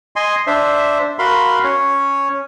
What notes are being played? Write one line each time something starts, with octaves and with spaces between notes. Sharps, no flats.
D#5 G#5 C6
D4 C5 E5
F#4 A#4 F5 B5 C6
C#4 C#5